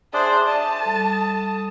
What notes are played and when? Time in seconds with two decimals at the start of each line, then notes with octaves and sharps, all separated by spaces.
0.14 D4 G#4 C5 D5 E5
0.48 A5 D#6
0.82 G3 A4